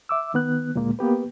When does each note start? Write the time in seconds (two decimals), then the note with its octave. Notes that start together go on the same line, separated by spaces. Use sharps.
0.09 E5 D6 E6
0.34 D#3 B3 F#6
0.75 D2 A#2 G#3 A#3
0.99 A#3 B3 G4 B4